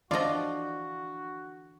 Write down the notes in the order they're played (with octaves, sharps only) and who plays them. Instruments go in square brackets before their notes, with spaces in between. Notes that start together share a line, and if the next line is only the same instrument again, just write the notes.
[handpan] D3 E3 D4 [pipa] F3 D5 [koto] F4 D#5 [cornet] F#4